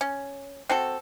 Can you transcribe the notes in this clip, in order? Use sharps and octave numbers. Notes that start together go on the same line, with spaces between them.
C#4
C4 F#4 A4